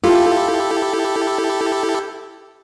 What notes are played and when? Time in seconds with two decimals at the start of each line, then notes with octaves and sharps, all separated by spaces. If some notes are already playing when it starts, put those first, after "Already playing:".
0.04 E4 F4 G4 A4